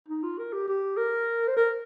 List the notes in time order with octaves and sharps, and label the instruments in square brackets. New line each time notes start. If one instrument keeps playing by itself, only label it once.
[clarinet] D#4
F4
A#4
G4
G4
A#4
C5
A#4